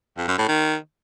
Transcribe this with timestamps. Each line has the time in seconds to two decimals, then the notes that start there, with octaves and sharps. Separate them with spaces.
0.18 F2
0.28 F#2
0.38 A2
0.49 D#3